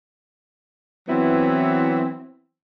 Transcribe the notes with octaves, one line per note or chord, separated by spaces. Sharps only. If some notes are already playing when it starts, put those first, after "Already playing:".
E3 F#3 B3 C4 E4